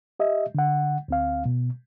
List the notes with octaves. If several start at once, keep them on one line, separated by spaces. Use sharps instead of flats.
G4 D#5 E5
D3 F#5
D2 C4 F5
B2